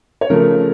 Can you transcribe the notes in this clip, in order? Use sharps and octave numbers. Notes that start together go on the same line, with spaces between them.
C#5
C#3 F3 A3 A#4